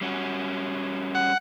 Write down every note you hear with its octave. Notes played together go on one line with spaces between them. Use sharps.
G3 C#4 F#4
F#5